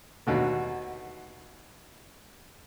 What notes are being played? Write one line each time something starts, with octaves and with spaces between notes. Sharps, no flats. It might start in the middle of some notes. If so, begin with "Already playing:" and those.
D#2 B2 D3 A3